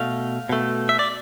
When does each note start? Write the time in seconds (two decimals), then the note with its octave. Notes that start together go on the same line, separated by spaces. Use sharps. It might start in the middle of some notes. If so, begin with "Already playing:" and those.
Already playing: B2 A3 F5
0.49 B2 A3
0.89 E5
0.99 D5